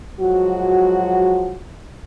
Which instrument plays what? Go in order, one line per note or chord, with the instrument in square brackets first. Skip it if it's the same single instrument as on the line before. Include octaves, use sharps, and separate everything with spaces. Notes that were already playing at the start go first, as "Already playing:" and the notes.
[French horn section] F3 F#3 G#3 F#4